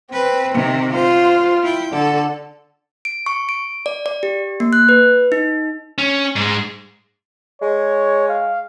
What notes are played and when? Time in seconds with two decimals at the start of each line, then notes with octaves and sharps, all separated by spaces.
0.13 C4 B4
0.54 C3 D#3
0.95 F4 C5
1.63 E4 G5
1.94 D3 A4
3.05 D7
3.26 C#6
3.49 D7
3.86 D5
4.06 D5
4.23 G4
4.60 A#3
4.73 F#6
4.89 B4
5.32 D#4
5.98 C#4
6.36 G#2 G#3
7.62 G#3 C#5
8.29 F5